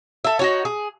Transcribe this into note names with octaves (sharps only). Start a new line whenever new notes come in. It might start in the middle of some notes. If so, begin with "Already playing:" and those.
A4 E5
D#4 F#4 C#5
G#4